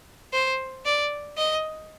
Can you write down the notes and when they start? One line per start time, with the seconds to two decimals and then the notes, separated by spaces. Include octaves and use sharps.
0.33 C5
0.85 D5
1.38 D#5